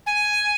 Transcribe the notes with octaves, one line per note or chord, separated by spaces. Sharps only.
G#5